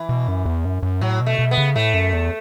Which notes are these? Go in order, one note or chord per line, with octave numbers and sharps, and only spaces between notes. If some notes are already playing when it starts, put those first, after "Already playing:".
Already playing: E3
B2
F#2
E2
F#2
F#2
A2 F#3
B2
A3
B2
B3
C#3
A2 A3
F#2
E2